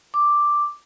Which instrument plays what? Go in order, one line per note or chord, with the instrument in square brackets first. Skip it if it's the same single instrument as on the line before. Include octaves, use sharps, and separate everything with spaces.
[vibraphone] D6